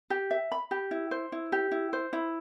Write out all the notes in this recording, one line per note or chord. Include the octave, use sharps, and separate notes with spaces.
G4
E5
B5
G4
E4
C5
E4
G4
E4
C5
E4